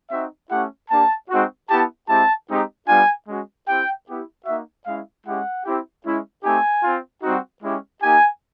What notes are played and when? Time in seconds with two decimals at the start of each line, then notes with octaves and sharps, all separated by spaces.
0.11 C4 D#4 F#4 E5
0.50 A3 C#4 E4 G4 F#5
0.90 A#3 D4 G4 A5
1.30 G#3 C4 D#4 F#4
1.70 B3 E4 G4 A5
2.09 G#3 C4 E4 G4 A5
2.49 G#3 C4 D#4 G4
2.88 G3 B3 D4 F4 G#5
3.27 G#3 C#4 F#4
3.67 C4 E4 G4 G5
4.07 B3 E4 G4
4.46 A#3 D#4 F#4 E5
4.86 G#3 C#4 E4 F5
5.25 G#3 C#4 E4 G4 F#5
5.65 C4 E4 G4
6.05 G#3 C#4 E4
6.44 A3 C4 D#4 G4 G#5
6.84 C4 F4
7.23 G3 C4 D#4 F#4
7.63 G#3 C#4 E4 G4
8.02 A#3 D#4 G4 G#5